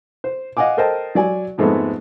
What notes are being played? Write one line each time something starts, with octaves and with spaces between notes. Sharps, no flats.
C5
D#5 F5 F#5 G#5 D6
A4 A#4 C5 D#5 G5 A5
F#3 D5 G#5
F2 G#2 G#3 A3 B3